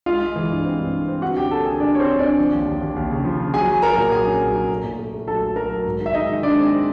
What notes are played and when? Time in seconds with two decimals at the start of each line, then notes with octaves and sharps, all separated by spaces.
0.06 G#3 F4 F5
0.21 G#3
0.36 E3
0.50 G2
0.64 C4
0.78 G2
0.94 C4
1.08 C4
1.22 D3 F#4 F#5
1.37 C#4 G4 G5
1.51 A#3 A4 A5
1.65 D3 G#4 G#5
1.80 G3 D4 D5
1.95 C#4 C#5
1.99 C4 C5
2.09 C#4
2.19 D3 D4 D5
2.38 F3
2.53 D#2
2.67 D#2
2.81 D#2
2.96 D#2
3.11 C#3
3.25 F3
3.40 C#3
3.54 F#3 G#4 G#5
3.69 F#3
3.82 F#3 A#4 A#5
3.97 A#2
4.12 F#3 G#4 G#5
4.26 C#4
4.41 F#3
4.55 C#4
4.69 A3
4.84 A#2
4.98 A3
5.13 A3
5.27 F#3 A4 A5
5.42 F#3
5.56 F#3 A#4 A#5
5.71 F#3
5.85 G#2
6.00 D#3
6.06 E5
6.14 G#3 D#4 D#5
6.28 D#3
6.43 G#3 D4 D5
6.58 C4
6.72 C4